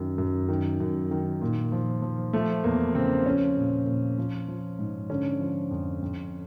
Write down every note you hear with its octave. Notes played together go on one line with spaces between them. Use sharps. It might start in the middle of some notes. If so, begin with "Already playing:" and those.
Already playing: F#2 D#3
F#2
D#3
F#2
D#3
A#2
F3
F3
F3 A3
E2 A#3
C#3 C4
F3 C#4
A#2
A#2
F3
F3
G#2
D3 C#4
F3
F2
F2